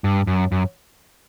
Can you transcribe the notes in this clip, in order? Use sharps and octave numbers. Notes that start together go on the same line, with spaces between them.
G2
F#2
F#2